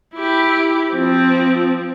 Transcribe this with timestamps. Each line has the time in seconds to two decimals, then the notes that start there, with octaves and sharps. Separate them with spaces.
0.15 E4 G4
0.93 F3 C4